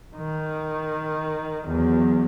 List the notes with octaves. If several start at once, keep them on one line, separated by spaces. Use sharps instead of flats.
D#3
E2 F#3